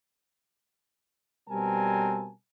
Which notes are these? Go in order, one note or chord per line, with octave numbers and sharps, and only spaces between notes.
B2 G3 C4 A#4 G#5 A5